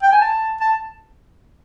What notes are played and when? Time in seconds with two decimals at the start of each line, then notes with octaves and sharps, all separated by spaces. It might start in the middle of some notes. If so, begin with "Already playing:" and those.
0.03 G5
0.12 G#5
0.21 A5
0.61 A5